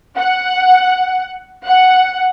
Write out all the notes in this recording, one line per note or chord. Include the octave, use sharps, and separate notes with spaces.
F#5
F#5